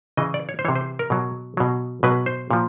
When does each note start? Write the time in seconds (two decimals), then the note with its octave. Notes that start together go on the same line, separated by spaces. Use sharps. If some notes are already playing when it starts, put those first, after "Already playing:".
0.17 C#3 E3 D#5
0.34 D5
0.49 C#5
0.59 C5
0.65 E3 C#5
0.68 C3
0.75 C5
0.99 A#4
1.10 B2 F#3
1.57 B2 F#3
2.03 B2 F#3 B4
2.26 C5
2.50 A#2 F3